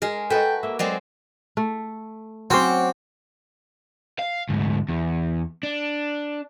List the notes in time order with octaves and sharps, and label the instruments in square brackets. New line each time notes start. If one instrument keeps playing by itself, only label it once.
[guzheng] G#3 A#4 [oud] G#4
[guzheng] F#4 B4 [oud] A4 D#5 [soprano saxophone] G5
[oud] A#3 [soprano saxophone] E5
[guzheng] F#3 G#3 C4 [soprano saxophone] D5
[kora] A3
[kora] F#3 C#4 C5 [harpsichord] C4 [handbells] F#5 C#6 D6
[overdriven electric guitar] F5
D2 G#2
E2
D4